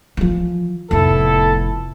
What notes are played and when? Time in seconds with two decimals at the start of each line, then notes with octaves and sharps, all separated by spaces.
0.17 E3 F3
0.91 F1 A2 B3 E4 A4